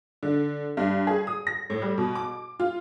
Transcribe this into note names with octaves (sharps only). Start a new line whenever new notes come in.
D3
G2
G#4
D#6
A#6
A2
G3
B2
D6
F4